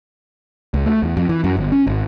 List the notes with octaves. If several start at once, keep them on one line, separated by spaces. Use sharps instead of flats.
C#2
A3
E2
F2
E3
F#2
G1
C#4
G#1